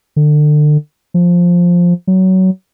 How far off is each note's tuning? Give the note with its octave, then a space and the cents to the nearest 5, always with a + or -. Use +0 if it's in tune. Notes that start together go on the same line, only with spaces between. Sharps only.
D3 +30
F3 +5
F#3 +20